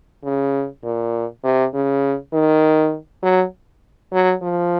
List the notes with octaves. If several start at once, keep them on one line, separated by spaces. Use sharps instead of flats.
C#3
A#2
C3
C#3
D#3
F#3
F#3
F3